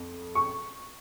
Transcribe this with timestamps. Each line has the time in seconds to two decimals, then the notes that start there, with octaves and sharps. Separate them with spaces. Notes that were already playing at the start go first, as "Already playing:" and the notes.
Already playing: F2
0.35 C#6